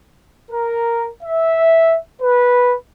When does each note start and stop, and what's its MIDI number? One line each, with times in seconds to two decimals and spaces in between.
0.51 1.09 70
1.23 1.97 76
2.22 2.76 71